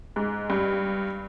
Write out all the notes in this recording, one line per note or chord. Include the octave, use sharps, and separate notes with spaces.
G#2
G2